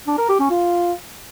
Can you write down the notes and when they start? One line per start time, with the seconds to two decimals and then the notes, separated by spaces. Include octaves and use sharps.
0.07 D4
0.18 A#4
0.29 G4
0.40 C#4
0.50 F4